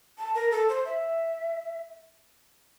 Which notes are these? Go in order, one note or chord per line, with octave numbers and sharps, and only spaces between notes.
A5
A#4
A4
C5
E5